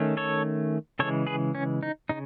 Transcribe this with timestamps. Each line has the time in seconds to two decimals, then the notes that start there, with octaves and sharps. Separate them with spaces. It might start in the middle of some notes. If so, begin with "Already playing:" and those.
Already playing: D#3 A3 C#4
0.17 A4 C#5
0.99 C#3 E3 G#3 A4 C#5
1.27 G#4 B4
1.55 C#4
1.83 D#4
2.09 C#3 D#4